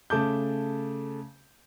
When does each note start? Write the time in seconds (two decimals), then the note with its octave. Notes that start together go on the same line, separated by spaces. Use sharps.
0.10 C#3 A3 A5 D6 G6